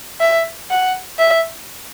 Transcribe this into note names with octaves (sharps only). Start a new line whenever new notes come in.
E5
F#5
E5